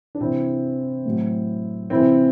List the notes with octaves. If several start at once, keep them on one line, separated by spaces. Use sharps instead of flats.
D4
C3 E3 C4 E4
A2 F#3
C3 E3 C4 E4